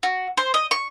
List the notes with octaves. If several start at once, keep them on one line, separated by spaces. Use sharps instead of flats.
F#4
C5
D#5
C#6